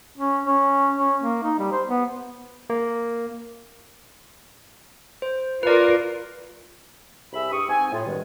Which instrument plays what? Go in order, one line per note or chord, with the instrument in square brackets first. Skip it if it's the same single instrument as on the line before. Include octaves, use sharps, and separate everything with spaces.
[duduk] C#4
C#4
C#4
A#3
D#4
G3
C5
B3
[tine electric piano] A#3
[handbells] C5
[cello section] F4 A#4 [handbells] B4 D5
[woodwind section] C2 G#4 E5 B5
G2 G4 C#6 D#6
G#2 C4 G#5
A2 F4
G2 B2 D#3 G3 G#3